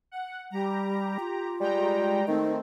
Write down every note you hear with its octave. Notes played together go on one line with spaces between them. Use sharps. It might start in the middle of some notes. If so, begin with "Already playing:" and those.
F#5
G3 G4 A#5
F4
G3 G#3 G5 A#5
D#3 A3 C4 D#4